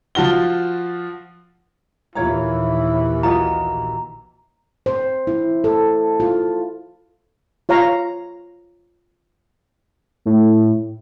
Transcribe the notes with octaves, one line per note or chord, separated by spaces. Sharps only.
F3 F4 F#4 G7
A#1 D#2 E3 E4 F4 C#5 A#5
F4 F#4 D#5 A#5
C5
E4
A4
F4
F4 C#5 F5 A#5
A2